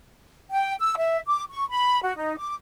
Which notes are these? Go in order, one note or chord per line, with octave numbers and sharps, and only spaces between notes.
G5
E6
E5
D6
C#6
B5
F#4
D#4
D6